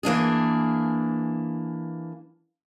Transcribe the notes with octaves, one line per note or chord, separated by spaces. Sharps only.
E3 A#3 D4 G#4